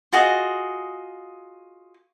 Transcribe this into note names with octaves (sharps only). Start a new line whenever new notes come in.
F4 F#4 G#4 D#5